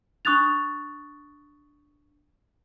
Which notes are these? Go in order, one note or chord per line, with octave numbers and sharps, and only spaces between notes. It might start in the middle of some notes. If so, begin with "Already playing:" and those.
D4 C#6 D#6 F#6 A6 F7